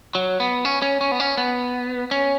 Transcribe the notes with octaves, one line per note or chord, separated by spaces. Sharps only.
F#3
B3
C#4
C#4
C#4
B3
C#4
B3
C#4